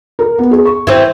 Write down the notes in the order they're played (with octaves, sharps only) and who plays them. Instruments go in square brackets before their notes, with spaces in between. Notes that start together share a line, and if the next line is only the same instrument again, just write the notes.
[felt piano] A#4
B3
G#4
C#6
[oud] E3 C4